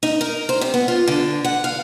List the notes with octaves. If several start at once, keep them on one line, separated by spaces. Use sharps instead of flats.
D#4
A#4
C5
C3
B3
F4
D3
F#5
F5